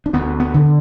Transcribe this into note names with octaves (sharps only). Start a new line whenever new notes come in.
D4
D2 B3
B3
D3